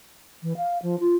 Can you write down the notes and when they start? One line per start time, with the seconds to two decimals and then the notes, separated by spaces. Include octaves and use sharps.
0.43 E3
0.57 F5
0.83 F3
1.00 F4